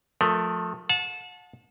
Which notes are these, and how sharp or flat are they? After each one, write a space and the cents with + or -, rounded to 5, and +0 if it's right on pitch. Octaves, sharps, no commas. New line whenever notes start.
F3 +30 A3 +0 A#4 +0
F#5 -40 A5 -15